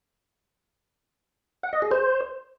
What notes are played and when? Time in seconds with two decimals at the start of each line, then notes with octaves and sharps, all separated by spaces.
1.63 F#5
1.73 D#5
1.82 G#4
1.91 C5